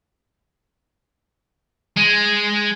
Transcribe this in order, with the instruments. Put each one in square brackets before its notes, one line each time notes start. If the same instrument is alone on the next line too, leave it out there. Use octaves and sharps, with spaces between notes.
[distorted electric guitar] G#3